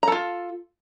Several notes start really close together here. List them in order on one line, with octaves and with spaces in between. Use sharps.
A#5 A4 F4